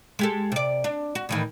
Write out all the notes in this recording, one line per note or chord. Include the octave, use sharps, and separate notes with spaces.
G#3 G4 A4
C3 D5
D4
F#4
A2 D#3 E3